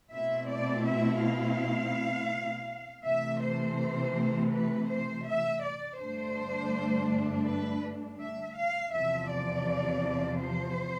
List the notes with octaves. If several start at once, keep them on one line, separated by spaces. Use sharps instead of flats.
B2 A3 C4 E4 E5
D5
E5
F5
C3 E3 A3 E5
C5
B4
C5
E5
D5
G2 D3 A3 D4 C5
B4
E5
F5
E2 C3 F3 E5
D5
C5